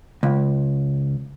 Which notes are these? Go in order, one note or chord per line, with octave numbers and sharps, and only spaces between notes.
C#2